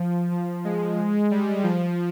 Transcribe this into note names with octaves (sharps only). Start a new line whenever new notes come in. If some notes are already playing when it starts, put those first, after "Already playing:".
Already playing: F3
F3
G#3
G3
F3